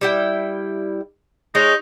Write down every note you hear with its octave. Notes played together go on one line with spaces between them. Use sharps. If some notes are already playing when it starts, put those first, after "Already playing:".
G3 E4 G5
G#3 D#4 C#5